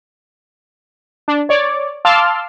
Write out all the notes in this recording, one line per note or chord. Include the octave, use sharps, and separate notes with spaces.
D4
C#5 D5 D6
F5 A5 C6 D6 E6 F6